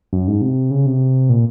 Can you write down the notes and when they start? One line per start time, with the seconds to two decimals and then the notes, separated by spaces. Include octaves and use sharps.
0.13 F#2
0.28 G#2
0.41 C3
0.71 C#3
0.86 C3
1.29 A#2